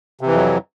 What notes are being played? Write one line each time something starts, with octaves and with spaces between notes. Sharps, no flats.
F2 C3 E3 F#3